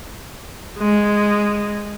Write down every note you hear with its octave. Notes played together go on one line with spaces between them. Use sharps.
G#3